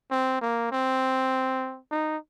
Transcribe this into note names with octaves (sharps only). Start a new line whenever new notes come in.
C4
A#3
C4
D#4